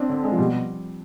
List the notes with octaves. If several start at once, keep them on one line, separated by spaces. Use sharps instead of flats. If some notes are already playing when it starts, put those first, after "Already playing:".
Already playing: C4 D4
D3
G#3
F3
B2 G3